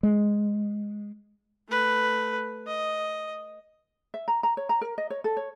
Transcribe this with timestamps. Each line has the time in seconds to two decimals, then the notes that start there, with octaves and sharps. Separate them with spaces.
0.03 G#3
1.68 A3 B4
2.67 D#5
4.14 E5
4.28 A#5
4.43 A#5
4.57 C#5
4.69 A#5
4.81 A#4
4.98 D#5
5.10 C#5
5.24 A4
5.37 C#5